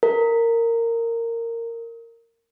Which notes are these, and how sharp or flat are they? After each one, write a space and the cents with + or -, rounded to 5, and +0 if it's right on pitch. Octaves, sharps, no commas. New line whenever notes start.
A#4 -15